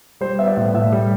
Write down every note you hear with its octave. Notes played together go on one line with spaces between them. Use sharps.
G3 C5
B3 E5
D5
A2
A2 E5
G3